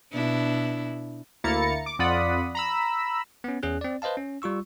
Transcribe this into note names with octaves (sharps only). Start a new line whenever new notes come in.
B2 D4 E4
D2 A#3 E4 A#5 A6 C#7
D6
F2 F4 D5 F#5 B5 D#6
A#5 B5 E6
B3 C#4
E2 C#4 G#4 F#6
C4 D5
B4 C5 D#5 F5 A5
C#4
G3 F4 C#6 E6